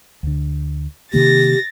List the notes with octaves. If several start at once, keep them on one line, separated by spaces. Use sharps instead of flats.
D2 D3
C3 D#3 A#3 G4 A6 A#6